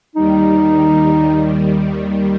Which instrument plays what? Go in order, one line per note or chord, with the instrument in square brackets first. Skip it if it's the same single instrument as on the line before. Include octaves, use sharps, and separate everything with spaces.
[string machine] D#2 D#3 G3 [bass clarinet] D#4